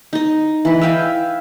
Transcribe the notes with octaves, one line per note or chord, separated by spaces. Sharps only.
D#4 D#5
E3 B4
E5 F5 G5 G#5